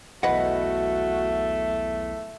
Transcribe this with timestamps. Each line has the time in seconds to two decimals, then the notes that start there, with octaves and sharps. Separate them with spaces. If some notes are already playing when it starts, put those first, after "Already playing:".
0.23 B1 E2 A3 F#4 B4 D#5 F#5